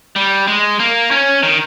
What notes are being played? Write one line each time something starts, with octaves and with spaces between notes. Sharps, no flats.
G3
G#3
A#3
C#4
D#3